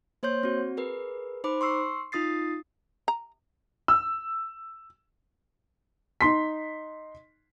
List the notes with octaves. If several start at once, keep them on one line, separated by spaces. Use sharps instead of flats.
A#3 C5 C#5 C6 G6
C4 F#4
G#4 A#4 B4
D#4 C5 B5 D6
C6 C#6 E6 C7
D#4 F4 D#6 A6 C7
A#5
E6
D#4 C6 B6